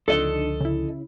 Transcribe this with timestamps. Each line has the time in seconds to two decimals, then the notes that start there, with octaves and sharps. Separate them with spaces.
0.08 C#2 D3 F3 D4 D#4 A4 D#5
0.61 C#3 E4